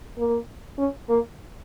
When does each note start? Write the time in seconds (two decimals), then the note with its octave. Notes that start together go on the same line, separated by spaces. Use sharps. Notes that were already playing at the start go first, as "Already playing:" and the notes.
0.18 A#3
0.78 C#4
1.09 A#3